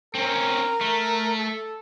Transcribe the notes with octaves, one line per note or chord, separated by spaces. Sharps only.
C4 C#4 A#4
A3
A4